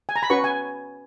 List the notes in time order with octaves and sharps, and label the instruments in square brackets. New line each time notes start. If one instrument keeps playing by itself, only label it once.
[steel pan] G#5
A#5
B5
C#4 F#4 B4 C#6
G#5